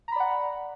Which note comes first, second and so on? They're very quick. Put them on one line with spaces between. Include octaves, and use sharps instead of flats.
A#5 B5 D5 F#5